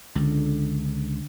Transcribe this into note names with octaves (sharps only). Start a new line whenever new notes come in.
C#2 D3